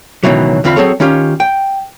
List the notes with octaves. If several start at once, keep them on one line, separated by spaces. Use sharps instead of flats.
C#2 B2 D#3 E3 F#3
E2 D3 C4 F4 F5 B5
F#3 C4 G#4 A4 C#5
D#3 C#4 F4 G4
G5